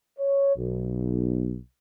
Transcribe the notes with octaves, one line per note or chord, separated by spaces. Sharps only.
C#5
B1